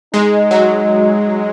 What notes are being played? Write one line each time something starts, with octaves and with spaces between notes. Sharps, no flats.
G#3 D#4
F#3